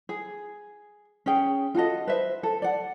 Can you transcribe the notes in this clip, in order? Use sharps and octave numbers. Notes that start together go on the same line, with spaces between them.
G#4
C#4 G#4 G5
F4 F#4 A4 D#5
B4 C5 E5
A4
D5 F#5